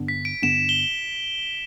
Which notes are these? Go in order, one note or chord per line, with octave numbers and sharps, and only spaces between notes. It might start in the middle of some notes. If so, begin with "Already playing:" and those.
Already playing: G2 D3 B3 D4
B6
D7
G2 D3 B3 D4 E7
G7